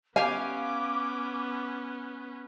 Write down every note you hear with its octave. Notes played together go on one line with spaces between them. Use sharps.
B3 C#4 G4 F5 G#5 D6